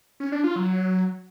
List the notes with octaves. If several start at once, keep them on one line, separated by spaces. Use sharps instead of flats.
C#4
D4
F4
F#3